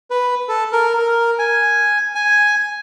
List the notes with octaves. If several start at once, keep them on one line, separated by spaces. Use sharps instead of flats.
B4
A4
A#4
A#4
G#5
G#5